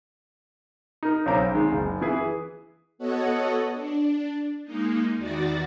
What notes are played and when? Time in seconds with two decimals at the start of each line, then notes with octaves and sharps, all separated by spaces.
1.03 D#4 A#4
1.26 B1 C#3 C5 A#5 D6
1.54 D#3 G#3 D#4
1.72 F#1
2.01 E3 E4 G#4 B4
2.98 B3 F#4 A4 C#5 D#5 F#5
3.73 D4
4.64 G#3 A#3 D#4
5.17 E2 D#3 F#4 D5 A6 A#6